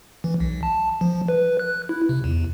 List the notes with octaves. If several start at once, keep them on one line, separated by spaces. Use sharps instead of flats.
E3
B1
A5
F3
B4
F#6
E4
C3
E2